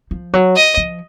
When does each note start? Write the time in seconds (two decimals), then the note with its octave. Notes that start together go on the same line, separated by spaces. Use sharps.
0.11 F3
0.33 F#3
0.56 D#5
0.77 F3